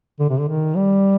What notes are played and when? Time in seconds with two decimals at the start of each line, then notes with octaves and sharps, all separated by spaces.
0.20 D3
0.29 C3
0.39 D3
0.49 D#3
0.76 G3